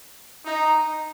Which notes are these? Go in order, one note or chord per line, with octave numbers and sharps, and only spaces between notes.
D#4